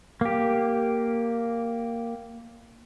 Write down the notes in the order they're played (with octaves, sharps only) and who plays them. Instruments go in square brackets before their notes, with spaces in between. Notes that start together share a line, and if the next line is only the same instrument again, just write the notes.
[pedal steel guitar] A#3 G4